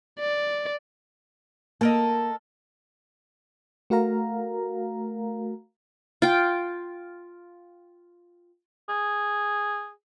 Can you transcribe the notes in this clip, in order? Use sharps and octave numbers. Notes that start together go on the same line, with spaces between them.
D5
A#3 A4 A#4 D#5
A3 F#4 A#4 F5 A#5
F4 G5
G#4